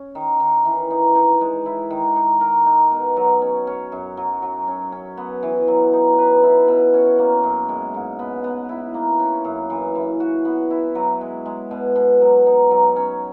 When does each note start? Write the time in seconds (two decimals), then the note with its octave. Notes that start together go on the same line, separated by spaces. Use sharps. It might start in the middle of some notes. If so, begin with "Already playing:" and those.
Already playing: C#4
0.15 D#3
0.40 D#3
0.65 E3
0.90 D#4
1.15 D#4
1.41 G#3
1.66 E4
1.90 D#3
2.16 D#4
2.41 A#4
2.66 D#4
2.91 B2
3.16 F#3
3.42 C#4
3.67 C#4
3.92 F#2
4.17 F#3
4.42 F#3
4.67 C#4
4.92 C#4
5.17 B3
5.43 E3
5.68 F#3
5.93 D#4
6.18 B4
6.43 E4
6.68 B2
6.94 C#4
7.19 A#3
7.43 F#2
7.69 G#3
7.94 G#2
8.19 B3
8.44 B3
8.69 E4
8.94 A#3
9.19 C#4
9.44 F#2
9.70 E3
9.95 E3
10.20 F#4
10.45 B3
10.70 E4
10.95 F#3
11.21 G#3
11.46 G#3
11.71 B2
11.96 B2
12.21 F#3
12.46 D#4
12.71 F#3
12.96 C#4